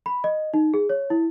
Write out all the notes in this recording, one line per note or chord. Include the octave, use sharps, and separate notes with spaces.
B5
D#5
D#4
G#4
C#5
E4